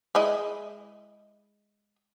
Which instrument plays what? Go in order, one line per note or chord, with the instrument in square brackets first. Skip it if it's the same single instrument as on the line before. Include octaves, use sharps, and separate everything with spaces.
[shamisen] G#3 E4 D#5